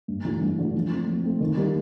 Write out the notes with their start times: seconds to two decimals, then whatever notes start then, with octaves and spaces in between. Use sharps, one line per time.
0.08 G2
0.25 E3 A3 D4 F#4
0.41 G2
0.58 E3 A3 D4 F#4
0.75 F3
0.91 A3 C4
1.07 F3
1.24 A3 C4
1.41 D#3
1.57 G3 A#3 D#4